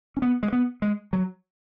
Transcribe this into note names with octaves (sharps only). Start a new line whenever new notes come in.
C#4
B3
G#3
B3
G#3
F#3